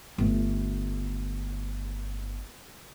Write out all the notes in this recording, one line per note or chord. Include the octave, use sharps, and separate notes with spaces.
G1 A3